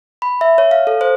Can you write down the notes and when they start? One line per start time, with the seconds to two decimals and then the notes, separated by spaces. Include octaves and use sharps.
0.22 B5
0.41 E5
0.58 C#5
0.71 F5
0.87 A4
1.01 C5